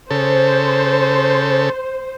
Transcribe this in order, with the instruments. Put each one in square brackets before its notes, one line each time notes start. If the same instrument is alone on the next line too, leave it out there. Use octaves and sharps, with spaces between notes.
[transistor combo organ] C#3 A4 [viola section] C5